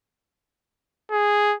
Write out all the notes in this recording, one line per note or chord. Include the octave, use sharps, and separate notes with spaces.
G#4